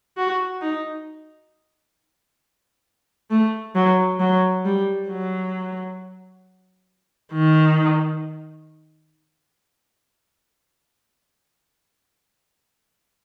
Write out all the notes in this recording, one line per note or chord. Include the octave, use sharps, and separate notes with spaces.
F#4
D#4
A3
F#3
F#3
G3
F#3
D#3